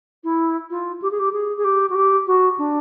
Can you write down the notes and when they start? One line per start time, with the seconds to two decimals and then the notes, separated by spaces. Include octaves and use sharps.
0.24 E4
0.70 F4
1.02 G4
1.11 G#4
1.19 G4
1.33 G#4
1.57 G#4
1.64 G4
1.89 F#4
1.95 G4
2.27 F#4
2.58 D4